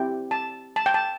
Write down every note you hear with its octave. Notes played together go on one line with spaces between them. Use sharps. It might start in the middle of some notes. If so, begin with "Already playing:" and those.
Already playing: C4 E4 G4 G5
A5
A5
G5
A5